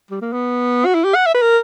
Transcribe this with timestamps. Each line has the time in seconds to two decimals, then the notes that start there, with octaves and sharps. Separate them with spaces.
0.11 G3
0.22 A#3
0.33 B3
0.85 F#4
0.95 E4
1.04 G4
1.15 F#5
1.26 E5
1.34 B4
1.42 A#4